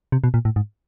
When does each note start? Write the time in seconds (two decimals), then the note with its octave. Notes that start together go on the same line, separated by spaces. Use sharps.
0.12 C3
0.24 B2
0.34 A#2
0.45 A2
0.56 G#2